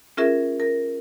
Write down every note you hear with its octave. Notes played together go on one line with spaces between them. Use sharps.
C#4 F4 G#4 A#4 E5
A#4